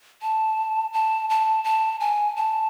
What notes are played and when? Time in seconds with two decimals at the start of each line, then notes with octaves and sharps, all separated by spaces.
0.22 A5
0.93 A5
1.30 A5
1.64 A5
2.00 G#5
2.36 A5